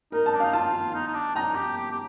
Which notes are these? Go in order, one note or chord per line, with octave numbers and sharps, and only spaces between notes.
D#4 A#4
A5
D4
D#4 F5
F4 A5
D#4
D#4
D4
D#4 A#5
G4
G4
G4